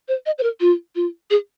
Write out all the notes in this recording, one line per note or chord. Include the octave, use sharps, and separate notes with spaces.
C5
D#5
C5
A#4
F4
F4
G#4